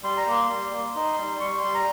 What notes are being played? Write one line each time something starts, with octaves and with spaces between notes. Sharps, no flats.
G3 C6
A#5
A#3 C6
G3
A#3
D#4
G3
G3 C#6
C6
G3
A#5